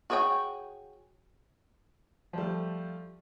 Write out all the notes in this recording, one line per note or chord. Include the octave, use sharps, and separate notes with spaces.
F#4 G#4 C#5 D5 G5
F3 G3 A3